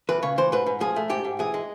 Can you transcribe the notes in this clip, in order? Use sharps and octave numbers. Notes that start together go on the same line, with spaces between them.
E2 B4
C#3 C#5
E3 C5
G#2 B4
G#2
F3 G#4
A3
G#2 G4
G#2
E3 G#4
G#3